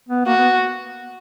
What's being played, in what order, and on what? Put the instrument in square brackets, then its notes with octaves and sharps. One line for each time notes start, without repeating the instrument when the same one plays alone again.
[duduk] B3
[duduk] A#3 [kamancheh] F#4
[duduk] B3